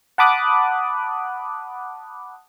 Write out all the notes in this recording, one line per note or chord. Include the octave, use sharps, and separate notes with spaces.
F#5 A5 B5 D6 D#6 F#6